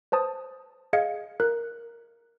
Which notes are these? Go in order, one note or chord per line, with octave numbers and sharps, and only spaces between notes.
B4 C5 A5 D#6
G#4 D#5 F5 G#6 C#7
A#4 F#6